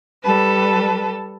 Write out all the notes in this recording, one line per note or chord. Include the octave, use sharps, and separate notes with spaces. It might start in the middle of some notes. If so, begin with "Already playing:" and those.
G3 A4 B4